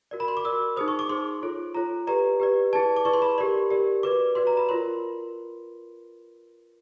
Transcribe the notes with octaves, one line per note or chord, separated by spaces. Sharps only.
F#4 A#4 D5
B5
C6
D6
F#4 A#4 D5 E6
D#4 G#4 C5 D#6
C#6
D6
D#4 G#4 C5 C6
F4 A4 C#5
F4 A4 C#5 A#5
G4 B4 D5 A#5
G4 B4 D5
E4 G#4 B4 D5 A5
D6
E4 G#4 B4 D5 C#6
C6
B5
G4 A#4 D5 C6
G4 A#4 D5
F#4 B4 D5 D6
F#4 B4 D5 C6
A#5
B5
F4 A#4 C#5 C6